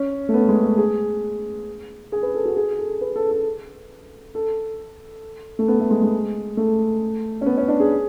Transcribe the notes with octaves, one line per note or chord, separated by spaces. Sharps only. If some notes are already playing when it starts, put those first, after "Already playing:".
Already playing: C#4
A3
B3
G#3
A3
G#4
G#4
B4
A4
F#4
G#4
A4
B4
A4
A4
A4
A3
B3
A3
G#3
G#3
A3
C#4
B3
C#4
D4
G#4